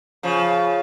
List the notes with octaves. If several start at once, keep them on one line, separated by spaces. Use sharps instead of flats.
C#3 F3